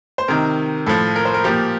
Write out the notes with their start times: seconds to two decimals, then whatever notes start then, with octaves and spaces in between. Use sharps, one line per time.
0.18 C5
0.28 C3 D#3 A#4
0.86 A2 F3 A4
1.16 A#4
1.25 C5
1.34 A#4
1.44 A#2 F3 G4